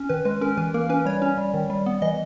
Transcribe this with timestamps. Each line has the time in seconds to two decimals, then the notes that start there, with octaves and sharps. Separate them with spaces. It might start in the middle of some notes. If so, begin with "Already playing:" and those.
Already playing: C#4
0.09 D#3 B4
0.25 G#3 B4
0.41 C#4 A#4
0.57 E3 B4
0.74 A#3 A#4
0.89 C#4 B4
1.05 G3 C#5
1.22 C#4
1.37 G3
1.54 D#3
1.70 G3
1.86 B3
2.02 E3 D#5